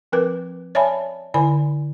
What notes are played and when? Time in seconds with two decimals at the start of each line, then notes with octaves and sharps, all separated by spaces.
0.12 F3 C4 A#4 B4 D6
0.75 C#5 D5 E5 G#5 A5 B5
1.34 D3 E4 C5 D5 G#5 B5